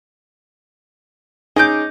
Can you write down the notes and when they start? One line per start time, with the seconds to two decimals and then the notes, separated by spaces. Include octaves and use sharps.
1.56 C#4 D#4 G#4 D#5 D6 G6